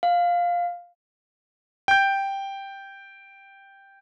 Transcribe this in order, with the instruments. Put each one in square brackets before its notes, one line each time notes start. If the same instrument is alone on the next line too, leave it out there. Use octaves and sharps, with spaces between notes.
[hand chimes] F5
[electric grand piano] G5 G6